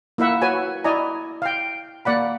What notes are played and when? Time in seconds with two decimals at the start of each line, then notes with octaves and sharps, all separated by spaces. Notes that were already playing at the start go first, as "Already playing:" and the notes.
0.18 A#3 E4 E5 F#5
0.42 F#4 B4 C#5 G#5
0.84 E4 D5 D#5 G#5 A#5
1.42 F5 G5
2.05 A#3 D5 F#5 B5